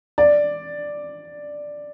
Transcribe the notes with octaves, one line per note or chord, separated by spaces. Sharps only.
D5